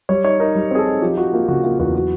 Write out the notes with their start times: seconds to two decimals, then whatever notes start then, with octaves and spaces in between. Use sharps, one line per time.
0.09 G3 C#5
0.24 D#4 C#5
0.40 D#4 A#4
0.55 G3
0.71 C4 G#4
0.79 A4
0.86 D#4
1.02 F3 G4
1.17 F3 F#4
1.33 A#3 F4
1.48 C#3 F#4
1.64 A#3 F4
1.79 E2 F#4
1.95 F#3 F#4